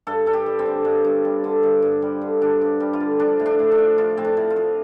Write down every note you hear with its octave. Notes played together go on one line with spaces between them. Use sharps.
G2 A4
G2 A4
G4
G3
C4
D3
G2
G2
G3
D3
G2
G2
G3
D3
G2 D4
G2
G3
F4
D3
F3 D4
A2
D4
A2
D4
F3
F3 F4
A2 C4
D4
A2
F4
F3